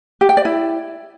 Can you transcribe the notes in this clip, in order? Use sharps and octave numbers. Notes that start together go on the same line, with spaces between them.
G4
G5
D5
E4